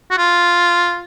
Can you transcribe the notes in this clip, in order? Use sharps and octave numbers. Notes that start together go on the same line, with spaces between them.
F#4
F4